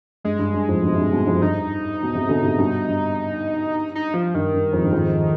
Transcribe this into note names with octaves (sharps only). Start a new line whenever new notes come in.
G2 G#3
G2
G2
F2 G#2
G2 B2
C3
G2 B2
G2 B2
F2 G#2
G2 D#4
B2
G#2 C3
B2 D3
G#2 C3
G2 B2
G2
D#4
F3
G2 D#3
G2
F2 G#2
G2
F2 G#2